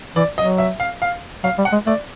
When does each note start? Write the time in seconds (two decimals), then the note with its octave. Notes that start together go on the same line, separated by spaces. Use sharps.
0.16 E3 D5
0.38 F#3 D#5
0.58 E5
0.80 F5
1.02 F5
1.44 F#3 F5
1.58 G3
1.65 F#5
1.72 G#3
1.87 A3 D5